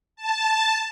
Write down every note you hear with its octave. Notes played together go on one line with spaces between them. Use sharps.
A5